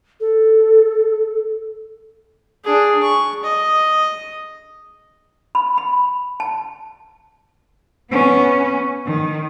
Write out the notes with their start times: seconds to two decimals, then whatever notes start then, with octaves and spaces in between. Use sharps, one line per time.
0.20 A4
2.64 D4 G#4
3.03 C#6
3.44 D#5
5.55 B5
5.78 B5
6.40 A5
8.11 B3 C#4
9.06 D#3